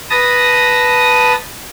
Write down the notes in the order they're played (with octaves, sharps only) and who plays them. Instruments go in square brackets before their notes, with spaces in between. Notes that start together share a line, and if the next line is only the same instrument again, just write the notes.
[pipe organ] B4 A5 D#6 A#6